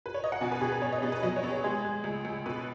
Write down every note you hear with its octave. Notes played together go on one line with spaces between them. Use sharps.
B4
C#5
D#5
F#5
B2 G#5
B4
B2 G#4
B4
B3 C#5
D#5
B3 G#4
B4
F#3 D#5
C#5
B3
G#4
G#3 G#4
G#3
C#2
C#2
B2 B4